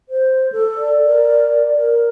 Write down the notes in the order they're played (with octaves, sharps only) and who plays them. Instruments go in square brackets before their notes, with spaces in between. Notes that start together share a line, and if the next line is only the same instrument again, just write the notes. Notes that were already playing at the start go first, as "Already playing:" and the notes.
[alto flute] C5
A4
[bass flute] D5
[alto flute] A#4
A#4